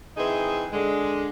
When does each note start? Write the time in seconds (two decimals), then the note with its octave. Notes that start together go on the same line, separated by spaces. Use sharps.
0.17 E3 C4 D#4 G#4 E5
0.72 D3 G#3